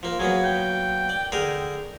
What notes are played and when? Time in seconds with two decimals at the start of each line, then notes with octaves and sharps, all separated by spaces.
0.03 F3 A#3
0.20 F#3 A#3 B3 G#4
0.45 G5
1.09 D5
1.32 D3 G#4 A#4